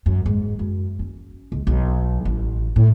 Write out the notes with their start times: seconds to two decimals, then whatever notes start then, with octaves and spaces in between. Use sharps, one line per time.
0.06 F#2
0.26 G#2
0.59 F#2
0.99 C#4
1.52 C#2
1.67 B1
2.25 A1
2.76 A2